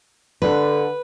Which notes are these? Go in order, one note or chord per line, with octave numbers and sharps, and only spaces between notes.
D3 B4